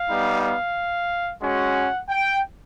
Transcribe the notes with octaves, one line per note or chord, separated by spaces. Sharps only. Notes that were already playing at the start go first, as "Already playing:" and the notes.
Already playing: F5
G3 B3 D#4
F5
G#3 C#4 F#4 F#5
G5